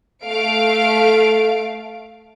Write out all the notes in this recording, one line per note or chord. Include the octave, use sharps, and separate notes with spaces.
A3 F5 D7